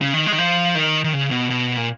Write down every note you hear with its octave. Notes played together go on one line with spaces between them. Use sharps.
C#3
D#3
G#3
D#3
F3
D#3
D#3
C#3
B2
B2
A#2